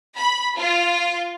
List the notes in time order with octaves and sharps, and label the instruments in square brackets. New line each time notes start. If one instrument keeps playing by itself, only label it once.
[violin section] B5
F4